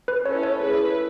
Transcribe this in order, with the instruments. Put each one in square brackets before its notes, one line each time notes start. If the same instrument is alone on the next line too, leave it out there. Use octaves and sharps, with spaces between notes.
[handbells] B4
[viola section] C#4 E4 A4 [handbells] C#5
[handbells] C#5
[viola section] A3 E4 G#4 B4